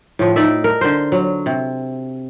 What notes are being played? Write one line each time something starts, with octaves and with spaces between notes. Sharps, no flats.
A2 F3
D#4 D5 E5
A#4
D3 C5
F#3
C3